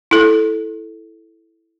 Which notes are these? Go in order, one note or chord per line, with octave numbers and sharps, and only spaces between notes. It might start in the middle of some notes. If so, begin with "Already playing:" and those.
E4 A4